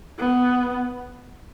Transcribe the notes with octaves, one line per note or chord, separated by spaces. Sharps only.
B3